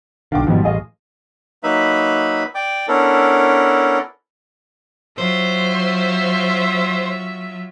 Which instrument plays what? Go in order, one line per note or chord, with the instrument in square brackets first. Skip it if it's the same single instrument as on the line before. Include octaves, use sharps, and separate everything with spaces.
[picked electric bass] B1 D3 [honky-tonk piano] F5 G5 D6
[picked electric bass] G#1 G#2 B2 [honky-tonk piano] F3 G3
[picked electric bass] A1 [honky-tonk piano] G#4 D#5 F5
[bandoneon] F#3 A#3 D#4 B4 E5 B5
D5 G5 D6
B3 C#4 D4 E4 A4 A#4
[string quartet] F#3 F4 [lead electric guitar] C5 [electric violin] E5